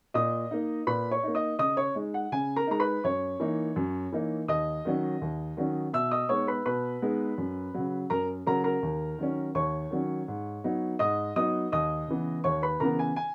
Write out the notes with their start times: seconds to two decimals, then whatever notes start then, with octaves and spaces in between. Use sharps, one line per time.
0.14 A#2 D#5 D#6
0.51 A#3 D#4
0.87 A#2 B4 B5
1.11 C#5 C#6
1.23 A#3 D#4
1.35 D#5 D#6
1.59 C#3 D#5 D#6
1.77 C#5 C#6
1.95 G#3 D#4
2.14 F#5
2.32 C#3 G#5
2.56 A#4 A#5
2.67 G#3 D#4 A#5
2.80 B4 B5
3.04 F#2 C#5 C#6
3.40 E3 A#3 D#4
3.76 F#2
4.12 E3 A#3 D#4
4.48 D#2 D#5 D#6
4.85 D#3 F#3 C#4
5.21 D#2
5.57 D#3 F#3 C#4
5.93 B2 E5 E6
6.11 D#5 D#6
6.29 G#3 B3 D#4 C#5 C#6
6.48 B4 B5
6.66 B2 B4 B5
7.02 G#3 B3 D#4
7.38 F#2
7.74 C#3 F#3
8.10 F#2 A#4 A#5
8.47 C#3 F#3 A#4 A#5
8.64 A#4 A#5
8.83 D#2
9.19 D#3 F#3 C#4
9.55 D#2 C#5 C#6
9.91 D#3 F#3 C#4
10.28 G#2
10.64 F#3 B3 D#4
10.99 G#2 D#5 D#6
11.36 F#3 B3 D#4 D#5 D#6
11.72 D#2 D#5 D#6
12.08 C#3 E3 B3
12.44 D#2 C#5 C#6
12.62 B4 B5
12.80 C#3 E3 B3 A#4 A#5
12.99 G#5
13.16 G#5